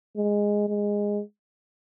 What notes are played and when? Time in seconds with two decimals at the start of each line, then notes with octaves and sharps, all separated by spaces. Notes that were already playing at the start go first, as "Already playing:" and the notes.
0.17 G#3
0.68 G#3